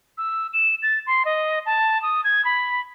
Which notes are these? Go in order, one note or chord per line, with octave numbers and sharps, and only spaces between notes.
E6
E7
A6
C6
D#5
A5
D#6
G#6
B5